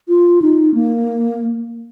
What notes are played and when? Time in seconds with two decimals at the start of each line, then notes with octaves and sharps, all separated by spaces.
0.08 F4
0.42 D#4
0.74 A#3